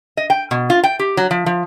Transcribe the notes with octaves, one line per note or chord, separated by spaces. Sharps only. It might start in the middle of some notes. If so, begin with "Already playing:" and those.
D#5
G5
B2
F4
G5
G4
F#3
F3
F3